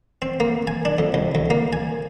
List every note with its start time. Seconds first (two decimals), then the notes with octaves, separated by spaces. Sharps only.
0.22 C4
0.40 A#3
0.67 G#5
0.85 D4
0.98 F2
1.14 C2
1.35 D2
1.50 A#3
1.73 G#5